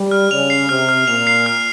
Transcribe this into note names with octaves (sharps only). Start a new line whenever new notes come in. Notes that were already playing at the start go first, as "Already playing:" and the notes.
Already playing: G3
F6
C#3 F7
C7
C3 F6
F6
A#2 F7
C7
F6